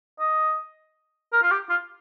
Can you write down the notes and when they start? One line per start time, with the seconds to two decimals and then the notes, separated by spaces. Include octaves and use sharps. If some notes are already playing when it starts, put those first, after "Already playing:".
0.20 D#5
1.33 A#4
1.43 F4
1.51 G4
1.69 F4